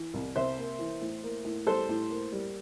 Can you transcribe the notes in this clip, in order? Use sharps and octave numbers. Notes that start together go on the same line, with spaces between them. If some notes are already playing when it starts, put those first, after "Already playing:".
Already playing: E3
C2
C3 C5 E5
A#3
E3
A2
A#3
A2
G3 A4 C5
A2
A#3
G3